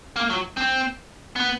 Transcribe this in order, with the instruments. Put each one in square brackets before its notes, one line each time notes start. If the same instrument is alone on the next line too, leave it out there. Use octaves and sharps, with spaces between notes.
[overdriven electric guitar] A#3
F#3
C4
B3